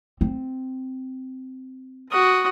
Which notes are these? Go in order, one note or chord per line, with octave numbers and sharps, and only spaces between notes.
C4
F#4 D#6